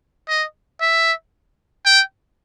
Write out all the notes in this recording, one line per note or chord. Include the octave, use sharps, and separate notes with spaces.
D#5
E5
G5